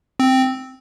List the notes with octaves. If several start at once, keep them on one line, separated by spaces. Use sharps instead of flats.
C4